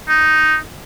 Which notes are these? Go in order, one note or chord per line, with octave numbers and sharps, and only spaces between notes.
D#4